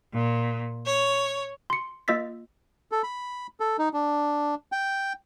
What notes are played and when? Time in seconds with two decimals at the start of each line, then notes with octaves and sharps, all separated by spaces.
0.13 A#2
0.86 C#5
1.70 C6 C#7
2.08 A#3 F4 D#5 E6 A6 B6
2.92 A4
3.03 B5
3.60 A4
3.79 D#4
3.94 D4
4.72 G5